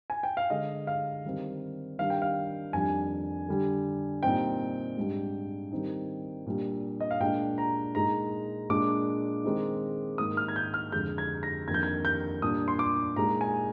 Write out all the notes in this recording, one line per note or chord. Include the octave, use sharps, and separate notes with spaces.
G#5
G5
F5
D3 G#3 D4 D#5
F5
D#3 G3 C4
D#3 G3 D4 F5
G5
F5
F2 D#3 G3 D4 G#5
D3 G3 D4
A#2 G3 C4 D#4 G5
G#2 G3 D4
D#3 G3 C4 D#4
A#2 G3 D4
D#5
F5
A#2 G#3 D4 G5
A#5
A#2 G#3 D#4 A#5
A#2 G#3 D4 D6
D#3 G#3 C4 D#4
G#2 D#3 A#3 D#4 D#6
F6
G#6
G6
F6
F2 D3 G#3 G6
G#6
A#6
F2 D#3 A#3 D4 G#6
G6
G#6
G6
A#2 G3 D4 D#6
C6
D6
A#2 G#3 D#4 A#5
G#5